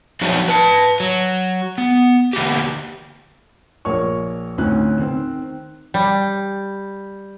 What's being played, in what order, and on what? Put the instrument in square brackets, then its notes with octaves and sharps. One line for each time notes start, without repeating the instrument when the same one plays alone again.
[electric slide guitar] F3 F#3 C4 D4 D#4 F#4
B4 A5
F#3
B3
D3 A#3 F#4 G4
[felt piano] A#1 A#4 C#5 C#6
D2 A2 C4 C#4 D#4 F#6
D#3 C4
[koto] G3